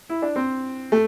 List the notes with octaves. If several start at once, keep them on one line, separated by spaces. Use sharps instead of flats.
E4
D4
C4
A3